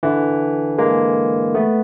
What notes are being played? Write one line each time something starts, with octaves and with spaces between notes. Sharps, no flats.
D3 E3
G#3 A#3
A3 B3